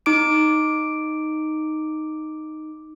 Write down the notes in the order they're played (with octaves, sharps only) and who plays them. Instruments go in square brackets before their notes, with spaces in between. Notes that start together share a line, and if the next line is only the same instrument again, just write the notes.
[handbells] D#4 D6 D7